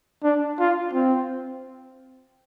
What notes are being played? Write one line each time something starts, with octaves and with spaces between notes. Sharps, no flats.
D4
F4
C4